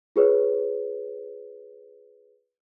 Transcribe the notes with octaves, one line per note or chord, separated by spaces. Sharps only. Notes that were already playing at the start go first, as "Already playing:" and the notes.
F4 G#4 B4 C#5